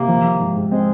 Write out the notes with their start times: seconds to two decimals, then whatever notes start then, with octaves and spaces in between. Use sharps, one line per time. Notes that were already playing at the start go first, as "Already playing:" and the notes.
Already playing: C3 A#3
0.08 F3
0.24 F3
0.40 G#2
0.55 G#2
0.71 G#3 C4